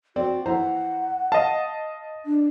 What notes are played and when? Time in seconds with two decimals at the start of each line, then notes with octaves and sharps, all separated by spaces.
0.16 C4 F#4 D5
0.46 E3 C5 F#5 A#5
1.32 D#5 F5 A5
2.26 D4